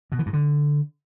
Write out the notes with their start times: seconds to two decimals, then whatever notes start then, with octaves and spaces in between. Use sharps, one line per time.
0.12 B2
0.19 E3
0.26 G2
0.33 D3